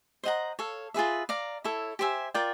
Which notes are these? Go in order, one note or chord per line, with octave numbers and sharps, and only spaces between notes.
C5 D#5 F#5 A#5
A4 C#5 F5
F4 G#4 B4 E5
D5 F5 A#5
E4 A4 C#5
G4 C5 E5 G#5
F4 A#4 D5 G5